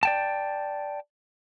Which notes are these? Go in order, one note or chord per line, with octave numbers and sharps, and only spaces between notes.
D5 G5 A5